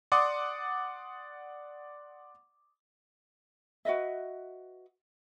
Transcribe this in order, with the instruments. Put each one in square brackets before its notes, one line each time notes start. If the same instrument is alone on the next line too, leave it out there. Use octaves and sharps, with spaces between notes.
[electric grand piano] D5 F#5 C6 D6 D#6
[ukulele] F#4 B4 D#5 E5